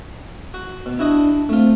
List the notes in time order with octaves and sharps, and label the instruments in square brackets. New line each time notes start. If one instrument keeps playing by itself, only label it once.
[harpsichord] F#4
B2
[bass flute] D4 [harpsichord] E4 F#4 D#5
[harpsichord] A3 F4 [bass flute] C4